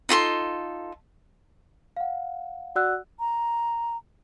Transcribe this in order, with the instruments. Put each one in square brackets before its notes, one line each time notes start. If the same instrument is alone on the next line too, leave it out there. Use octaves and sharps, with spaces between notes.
[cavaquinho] D#4 F4 A4 C6
[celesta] F5 F#5
F#4 D5 F#5 E6 F#6
[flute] A#5